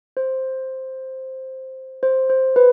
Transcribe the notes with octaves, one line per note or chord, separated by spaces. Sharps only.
C5
C5
C5
B4